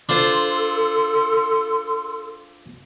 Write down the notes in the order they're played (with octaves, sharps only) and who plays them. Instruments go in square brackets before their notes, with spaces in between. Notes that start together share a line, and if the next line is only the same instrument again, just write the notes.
[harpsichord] D4 F4 C5 [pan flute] A4 [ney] C6